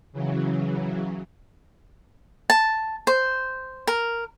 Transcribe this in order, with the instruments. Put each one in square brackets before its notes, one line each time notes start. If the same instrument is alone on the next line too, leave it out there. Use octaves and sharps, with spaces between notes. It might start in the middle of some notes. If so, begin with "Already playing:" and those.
[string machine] C#3 E3 F#3
[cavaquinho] A5
C5
A#4